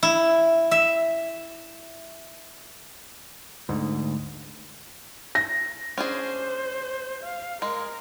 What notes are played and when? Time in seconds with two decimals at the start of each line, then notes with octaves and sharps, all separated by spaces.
0.03 E4
0.71 E5
3.69 D2 G#2
5.35 A#6
5.98 C#4 D4 G#4 C5
7.24 F5
7.62 G#3 A#4